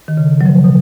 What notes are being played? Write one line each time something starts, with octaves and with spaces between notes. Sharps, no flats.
D#3
C#3
F#3
C#3 F3
B2